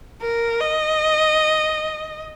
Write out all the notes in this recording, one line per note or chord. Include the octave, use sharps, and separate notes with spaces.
A#4
D#5